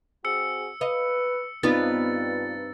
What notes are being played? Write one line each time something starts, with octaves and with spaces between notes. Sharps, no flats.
C4 F#4 G#4 E6 C#7
B4 D#5 F5
G2 B3 C4 D#4 F4 B4 A6